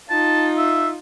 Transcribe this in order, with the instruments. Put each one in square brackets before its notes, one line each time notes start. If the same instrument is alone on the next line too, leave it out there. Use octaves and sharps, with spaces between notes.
[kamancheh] D#4 F4 [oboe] A5
[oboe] E5